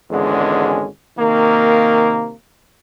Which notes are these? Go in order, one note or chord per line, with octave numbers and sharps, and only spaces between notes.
G#1 E2 D3 G#3 C#4
C3 D#3 A#3